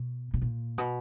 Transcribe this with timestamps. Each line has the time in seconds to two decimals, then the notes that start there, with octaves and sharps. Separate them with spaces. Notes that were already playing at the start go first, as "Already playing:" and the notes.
Already playing: B2
0.34 B2
0.42 A#2
0.78 B2